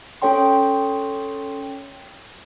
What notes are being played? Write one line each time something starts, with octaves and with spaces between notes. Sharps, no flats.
C#4 A4 C#5 G5 C6